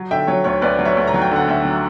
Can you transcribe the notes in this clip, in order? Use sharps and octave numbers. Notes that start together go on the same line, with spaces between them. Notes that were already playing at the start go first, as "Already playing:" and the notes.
Already playing: F#3
D3 E5 G5
F#3 C#5
D2 C#5
D2 B4 D5
F#3
C#5 E5
D2
A#5
F#3
G5
D3 F#5
D2 E5 G5
F#3